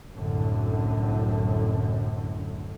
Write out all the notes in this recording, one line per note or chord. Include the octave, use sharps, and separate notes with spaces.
C2 F#2 A2 D3